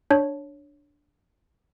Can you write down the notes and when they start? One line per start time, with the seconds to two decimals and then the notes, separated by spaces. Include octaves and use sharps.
0.11 D4 C#5